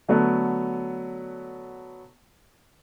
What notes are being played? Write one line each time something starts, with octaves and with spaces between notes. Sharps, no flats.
D3 F#3 A3 B3